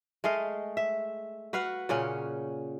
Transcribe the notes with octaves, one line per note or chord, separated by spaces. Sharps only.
G#3 A3 D#5 F5
E5
F#4 B4 F5 F#5
A#2 C#3 C#4 F#5